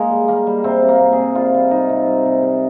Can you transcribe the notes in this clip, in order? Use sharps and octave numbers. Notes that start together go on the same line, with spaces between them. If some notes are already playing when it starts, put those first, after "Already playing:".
Already playing: G#3 A#3
G3
G3 A#3
G3
C3 C4
C3
A#3
C3
G#4
C3
G3 F4
G3
G3 D#4
C3
G3
C3
C3